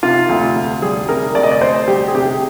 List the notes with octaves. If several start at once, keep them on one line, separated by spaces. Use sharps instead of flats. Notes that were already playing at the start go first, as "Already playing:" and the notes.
C3 F4
D2
D2
G3 G#4
C3 A#4
D2 D5
D#5
D5
D2 C5
G3 G4
G#4
C3 G4